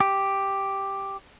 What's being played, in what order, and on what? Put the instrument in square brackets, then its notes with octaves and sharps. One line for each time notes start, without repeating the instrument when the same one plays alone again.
[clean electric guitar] G4